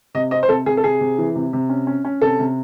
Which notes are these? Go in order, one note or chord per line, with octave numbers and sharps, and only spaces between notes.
C3 D#5
C4 D#5
C5
C3 A4
C3 G#4
A4
C3 G#4
C3
E3
C3
C3
C#4
C#4
C#4
C3 A4
C3